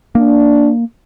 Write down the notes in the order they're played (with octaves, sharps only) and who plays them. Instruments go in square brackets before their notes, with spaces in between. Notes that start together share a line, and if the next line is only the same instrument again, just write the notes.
[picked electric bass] A#3 [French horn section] D4